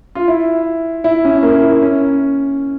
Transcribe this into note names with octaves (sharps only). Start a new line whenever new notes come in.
F4
E4
E4
C#4
A#3
E4
C#4